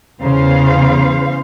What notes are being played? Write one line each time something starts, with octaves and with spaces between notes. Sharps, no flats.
E2 C#3 C5 F5